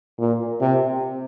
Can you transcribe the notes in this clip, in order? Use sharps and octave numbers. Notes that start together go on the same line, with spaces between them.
A#2
C3